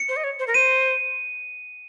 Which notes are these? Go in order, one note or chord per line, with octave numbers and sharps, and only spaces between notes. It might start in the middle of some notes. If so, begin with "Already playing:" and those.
Already playing: C#7
C5
D#5
C#5
C5
A#4
C5 D#7